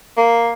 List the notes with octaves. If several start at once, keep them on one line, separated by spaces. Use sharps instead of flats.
A#3